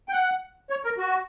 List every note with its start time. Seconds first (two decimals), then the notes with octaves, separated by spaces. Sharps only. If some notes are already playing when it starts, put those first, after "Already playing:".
0.09 G5
0.13 F#5
0.70 C#5
0.84 A#4
0.98 F#4